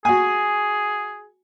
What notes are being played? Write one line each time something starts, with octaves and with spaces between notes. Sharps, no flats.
F#4 G#4 G#5